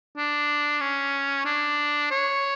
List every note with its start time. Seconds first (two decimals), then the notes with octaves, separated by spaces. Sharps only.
0.17 D4
0.80 C#4
1.45 D4
2.10 C#5